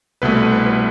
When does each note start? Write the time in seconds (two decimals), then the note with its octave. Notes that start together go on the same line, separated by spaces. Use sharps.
0.22 C2 B2 A3 B4
0.37 B4
0.52 B4
0.66 B4